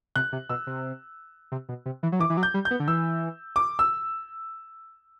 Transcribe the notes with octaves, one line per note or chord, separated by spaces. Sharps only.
C3 F#6
C3
B2 E6
C3
C3
B2
C3
E3
F#3
E3 D6
E3
F#3
G6
G3
G6
B3
D3
E3 E6
D6
E6